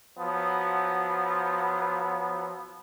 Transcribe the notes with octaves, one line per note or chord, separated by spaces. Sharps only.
F3 F#3 B3